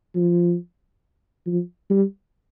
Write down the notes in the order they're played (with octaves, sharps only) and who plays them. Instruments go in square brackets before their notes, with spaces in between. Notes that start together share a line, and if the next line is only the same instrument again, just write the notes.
[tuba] F3
F3
G3